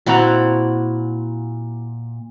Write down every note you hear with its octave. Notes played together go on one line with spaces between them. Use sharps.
A#2 C4 E4 F#4 F#5 A#5